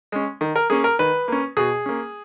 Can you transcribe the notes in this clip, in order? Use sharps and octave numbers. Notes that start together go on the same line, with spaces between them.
G#3 C#4
D#3
A#4
A#3 C#4 G#4
A#4
D#3 B4
A#3 C#4
B2 G#4
A#3 C#4